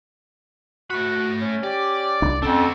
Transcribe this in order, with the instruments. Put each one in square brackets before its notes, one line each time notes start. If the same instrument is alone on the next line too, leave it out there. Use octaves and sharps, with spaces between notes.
[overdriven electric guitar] A3 B5 [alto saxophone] F#4
[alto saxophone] C#4
[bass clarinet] G4 [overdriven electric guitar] D5
[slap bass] C2 D4
[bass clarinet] F2 [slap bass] C#4 [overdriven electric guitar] D4 F#4 [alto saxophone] A4